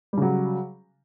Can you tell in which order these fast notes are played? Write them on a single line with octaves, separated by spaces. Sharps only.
G3 C#3 F#3